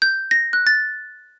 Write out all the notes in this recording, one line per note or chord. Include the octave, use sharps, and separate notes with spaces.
G6
A#6
F#6
A6